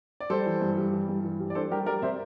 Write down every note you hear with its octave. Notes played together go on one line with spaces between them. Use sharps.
D5
G3 A4 C5
E3
G2
G3
E3
G2
E3
G3
D5
D4 A4 C5
G3 G4 A#4
G3 A#4 D5
C3 C5 E5